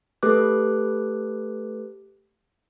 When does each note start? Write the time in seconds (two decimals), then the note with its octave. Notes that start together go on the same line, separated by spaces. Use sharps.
0.23 A3 G4 A4 B4 D6 F#6